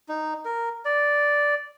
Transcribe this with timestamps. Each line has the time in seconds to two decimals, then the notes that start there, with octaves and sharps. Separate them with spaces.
0.09 D#4
0.45 A#4
0.85 D5